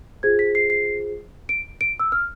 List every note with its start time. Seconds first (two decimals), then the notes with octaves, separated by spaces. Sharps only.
0.23 F4 G#4 C5 G#6
0.39 B6
0.55 C7
0.70 C7
1.49 D7
1.81 D7
2.00 E6
2.12 F6